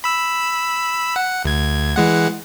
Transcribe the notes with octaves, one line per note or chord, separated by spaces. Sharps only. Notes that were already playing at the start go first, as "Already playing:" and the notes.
B5 E6
F#5
D2 G#6
E3 G#3 F#5